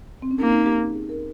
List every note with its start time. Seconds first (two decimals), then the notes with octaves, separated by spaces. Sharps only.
0.22 C4
0.31 C#4
0.40 A#3 D#4
0.53 D#4
0.66 G4
0.92 G#4
1.09 A#4